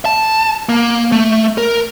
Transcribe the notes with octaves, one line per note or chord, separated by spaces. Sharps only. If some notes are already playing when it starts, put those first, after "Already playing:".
A5
A#3
A3
A#4